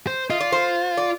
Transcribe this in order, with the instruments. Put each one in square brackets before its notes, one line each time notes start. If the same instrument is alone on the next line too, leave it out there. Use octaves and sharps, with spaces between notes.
[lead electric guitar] C5
[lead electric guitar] F4 [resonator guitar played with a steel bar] D#5
[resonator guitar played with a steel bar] D5
C5
D5